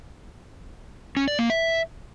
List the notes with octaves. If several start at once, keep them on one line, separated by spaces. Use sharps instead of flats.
C#4
D5
A#3
E5